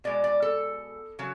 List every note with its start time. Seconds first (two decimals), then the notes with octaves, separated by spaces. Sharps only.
0.04 B2 G#3 D5
0.24 D5
0.42 A4
1.19 C#3 F#3